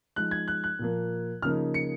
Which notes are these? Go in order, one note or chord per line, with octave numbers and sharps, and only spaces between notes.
F3 G#3 D#4 F#6
G#6
F#6
F#6
A#2 F3 A#3
C#3 F3 A#3 D#4 F6
C#7